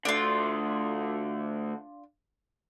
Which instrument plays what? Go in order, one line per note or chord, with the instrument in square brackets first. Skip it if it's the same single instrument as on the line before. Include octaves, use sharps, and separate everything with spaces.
[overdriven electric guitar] D3 A3 [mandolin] D4 F4